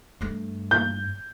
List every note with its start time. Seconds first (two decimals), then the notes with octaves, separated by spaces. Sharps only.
0.21 G2 A3
0.71 G6